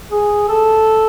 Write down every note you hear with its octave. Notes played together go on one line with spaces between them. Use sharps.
G#4
A4